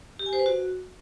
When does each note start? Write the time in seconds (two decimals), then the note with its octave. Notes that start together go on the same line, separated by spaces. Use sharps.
0.19 G4
0.26 G#5
0.33 C5
0.39 B4
0.46 F#4